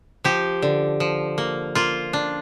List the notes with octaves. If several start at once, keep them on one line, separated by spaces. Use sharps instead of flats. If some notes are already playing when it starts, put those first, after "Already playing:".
F3 G4
D3
F3
A#3
A#3 F4
D4